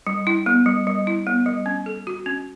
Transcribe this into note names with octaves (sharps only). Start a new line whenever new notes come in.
G3
E4
B3
G3
G3
E4
B3
G3
C#4
A4
F#4
C#4